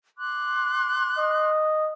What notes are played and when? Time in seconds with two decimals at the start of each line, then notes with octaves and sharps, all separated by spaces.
0.17 C6 D6 F#6
1.18 D#5